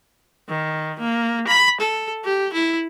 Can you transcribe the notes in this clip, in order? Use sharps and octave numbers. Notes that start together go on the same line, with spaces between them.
D#3
A#3
B5
A4
G4
E4